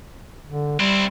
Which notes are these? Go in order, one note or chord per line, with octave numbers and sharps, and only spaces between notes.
D3
G3 C4 E4